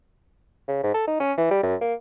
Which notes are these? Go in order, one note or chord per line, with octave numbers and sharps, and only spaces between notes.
C#3
G#2
A4
D#4
C#4
E3
G3
F#2
A#3